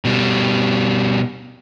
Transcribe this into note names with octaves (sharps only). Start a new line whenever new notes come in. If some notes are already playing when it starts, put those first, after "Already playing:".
B2 G3